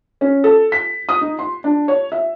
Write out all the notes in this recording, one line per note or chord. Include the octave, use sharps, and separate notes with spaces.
C#4
A4
B6
D#6
D#4
C6
D4
C#5
E5